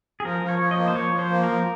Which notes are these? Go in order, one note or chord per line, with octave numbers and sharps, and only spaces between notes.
G#4
F3 A#4
F3
C#5
F3
D#5
A#3
C5
F3 C#5
F3
C5
A#3
A#4
F3